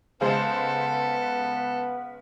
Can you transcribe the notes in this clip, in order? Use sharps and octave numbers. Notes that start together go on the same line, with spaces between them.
C#3 G#3 B3 A4 B4 C5